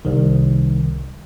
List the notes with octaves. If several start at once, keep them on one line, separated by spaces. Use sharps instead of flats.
C2 D#3